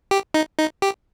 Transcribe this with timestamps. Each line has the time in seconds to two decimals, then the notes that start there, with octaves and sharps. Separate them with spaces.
0.11 G4
0.34 D#4
0.59 D#4
0.82 G4